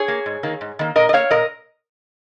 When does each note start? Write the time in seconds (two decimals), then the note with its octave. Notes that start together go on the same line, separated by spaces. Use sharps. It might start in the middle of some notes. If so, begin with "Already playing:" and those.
Already playing: G#4 C#5
0.08 A#3
0.26 G#2
0.43 D#3 A#3
0.61 G#2
0.79 D#3 A#3
0.96 A#2 A#4 D#5
1.09 D#5
1.13 A#3 C#5 F5
1.31 A#2 A#4 D#5